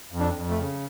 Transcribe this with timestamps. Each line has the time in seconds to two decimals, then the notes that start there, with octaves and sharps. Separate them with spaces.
0.12 F2
0.20 D4
0.34 F2
0.50 A3
0.57 C#3